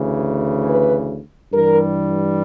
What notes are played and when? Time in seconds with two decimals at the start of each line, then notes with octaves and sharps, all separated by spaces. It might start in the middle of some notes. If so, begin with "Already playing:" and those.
Already playing: D2 C#3 E3
0.70 B4
1.53 G2 E3 G3 A#4